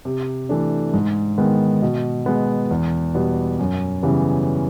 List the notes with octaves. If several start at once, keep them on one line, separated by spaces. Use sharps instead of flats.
C3
E3 A3 D4
G#2
D#3 G#3 B3
B2
G#3 B3
E2
B2 G3 B3
F#2
C#3 E3 G3 B3